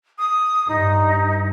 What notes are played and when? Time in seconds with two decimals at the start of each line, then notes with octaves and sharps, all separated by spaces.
0.18 D#6
0.68 G2 D#4